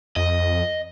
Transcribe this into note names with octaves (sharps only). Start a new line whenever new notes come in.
F2 D#5